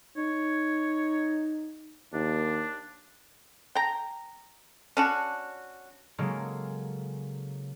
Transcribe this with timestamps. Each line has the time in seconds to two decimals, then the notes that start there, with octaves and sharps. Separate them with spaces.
0.17 D#4 C#5
2.13 D#2 D4
3.75 G5 A#5
4.97 C#4 D4 F#4
6.18 C#3 F#3 G#3 A#3 A4